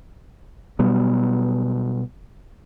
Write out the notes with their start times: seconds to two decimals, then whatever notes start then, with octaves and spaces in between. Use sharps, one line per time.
0.79 B2 F#3 G3 B3